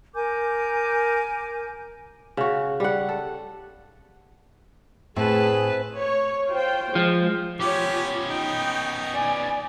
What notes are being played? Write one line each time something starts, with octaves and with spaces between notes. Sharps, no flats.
A#4 G#5 D6 G6
C#3 F#4
G3 F#5
A4
A2 C4 G#4 B4 A5
C#5
F4 C5 G5
F3 G#3
B3 C#4 F4 G4 C#5
D#4 G5
D5 G#5